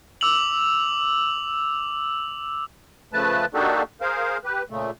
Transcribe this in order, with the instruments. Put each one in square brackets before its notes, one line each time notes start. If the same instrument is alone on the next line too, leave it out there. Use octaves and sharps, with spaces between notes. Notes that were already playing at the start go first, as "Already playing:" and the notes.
[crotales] D6 E6 F7 F#7
[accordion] C#3 F3 A3 B4 A5
A#3 D4 D#4 F#4 G4 A4
G#4 A#4 C5 F5
G4 B4
A#2 C#3 A3